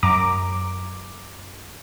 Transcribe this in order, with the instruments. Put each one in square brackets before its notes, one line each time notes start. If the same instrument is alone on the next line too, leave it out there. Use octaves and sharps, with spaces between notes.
[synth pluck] F#2 A#5 D6